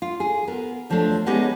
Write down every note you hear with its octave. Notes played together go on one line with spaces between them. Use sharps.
F4
G#4
B3 A#4
E2 F3 F#3 A3 D4
G#3 B3 C#4 D#4 G4 G#4